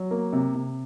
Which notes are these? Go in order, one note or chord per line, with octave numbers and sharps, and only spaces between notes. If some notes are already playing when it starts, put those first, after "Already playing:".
Already playing: F#3
A#3
C3
C3